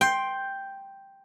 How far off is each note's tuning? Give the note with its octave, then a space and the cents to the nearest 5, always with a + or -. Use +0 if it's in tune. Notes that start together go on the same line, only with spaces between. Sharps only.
G5 +0 C6 +10